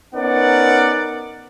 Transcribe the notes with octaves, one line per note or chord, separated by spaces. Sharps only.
B3 C#4 D#4 A#4 D5 F#5